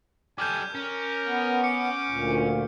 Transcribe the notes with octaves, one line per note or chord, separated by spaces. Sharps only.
G3 A4 G#5 D6 F6 G6
C#4 A#4
B3
D6 C#7
D2 A#2